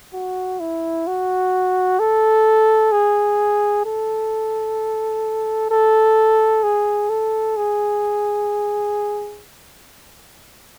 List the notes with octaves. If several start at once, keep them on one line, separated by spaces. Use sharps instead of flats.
F#4
E4
F#4
A4
G#4
A4
A4
G#4
A4
G#4